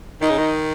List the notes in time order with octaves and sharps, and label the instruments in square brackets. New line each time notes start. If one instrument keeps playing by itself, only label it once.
[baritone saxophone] D#3 [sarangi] D#4
[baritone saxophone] C#3
D#3